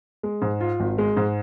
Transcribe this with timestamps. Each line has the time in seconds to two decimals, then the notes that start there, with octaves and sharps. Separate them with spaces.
0.23 G#3
0.42 G#2
0.61 F4
0.80 G#1
0.98 G#3
1.17 G#2